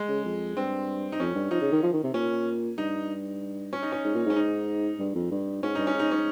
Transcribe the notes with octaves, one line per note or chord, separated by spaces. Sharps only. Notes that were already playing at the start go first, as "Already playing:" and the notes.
Already playing: G#3
C#3
F2
G2 C4
D#4
F2 C#4
G2
F3 D#4
C#3
D#3
F3
D#3
C3
A#2 C#4
G2 D#4
C#4
D#4
C#4
G#2
A#2
G#2 C#4
D#4
G2
F2
G2
G#2 C#4
G2 D#4
C#4
G#2
D#4
C#4